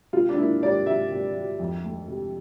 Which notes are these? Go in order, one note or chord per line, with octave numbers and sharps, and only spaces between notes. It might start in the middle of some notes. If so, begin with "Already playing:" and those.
C3 F4
D4
A#3 E4
G3 D5
C3 E5
C3
G3
F2
A3
C3